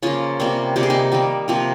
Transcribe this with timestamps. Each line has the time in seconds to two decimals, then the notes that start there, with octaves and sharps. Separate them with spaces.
0.03 C#3 F3 A#3 C#4 F4
0.40 C3 G3 A#3
0.76 C3 G3 A#3 G4
0.83 G#4
0.90 D#4 G4
1.12 D#3 G3 A#3
1.48 C3 F3 A#3